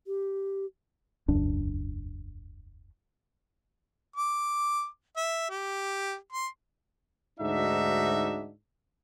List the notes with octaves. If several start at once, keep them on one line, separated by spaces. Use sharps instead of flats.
G4
E1 C#2 F#2 D4
D6
E5
G4
C6
D2 G#2 D4 D#4 F#4 E5